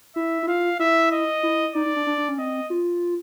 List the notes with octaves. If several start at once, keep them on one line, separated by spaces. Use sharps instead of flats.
E4 E5
E4
F4 F5
E4 E5
D#5
E4
D#4 D5
D#4
D4
D4
D4
C#4
C4 D#5
F4